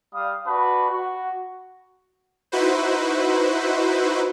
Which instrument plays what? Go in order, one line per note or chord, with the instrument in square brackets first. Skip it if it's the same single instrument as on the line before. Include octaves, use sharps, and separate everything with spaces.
[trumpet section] G3 F5 D#6
D4 F#4 B4
F#4
[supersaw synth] D#4 E4 F#4 B4 C5